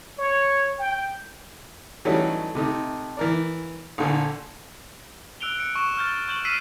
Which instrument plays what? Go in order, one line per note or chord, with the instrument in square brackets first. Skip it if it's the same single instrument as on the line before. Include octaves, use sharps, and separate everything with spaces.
[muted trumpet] C#5
G5
[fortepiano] E3 F#3 G3 A3 C#4 D#4
C3 A3 D#4
E3 A#4 D5
A#1 D3 G#5
[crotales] E6 F#6 D7 F7 G7
C#7 D7
C#6 E7
F6 G6 A6
C#6 G6 E7 F#7
E6 F6 B6 C7 D7 D#7